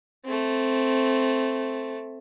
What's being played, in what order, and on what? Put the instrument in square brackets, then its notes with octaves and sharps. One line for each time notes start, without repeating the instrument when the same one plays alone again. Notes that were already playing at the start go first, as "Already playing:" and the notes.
[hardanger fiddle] A3 C4